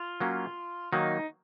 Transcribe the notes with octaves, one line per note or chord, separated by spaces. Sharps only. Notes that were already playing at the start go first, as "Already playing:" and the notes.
Already playing: F4
F#3 A#3 C#4
D#3 F#3 A#3 D#4